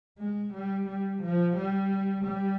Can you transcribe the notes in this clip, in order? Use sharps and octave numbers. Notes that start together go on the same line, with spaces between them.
G#3
G3
G3
F3
G3
G3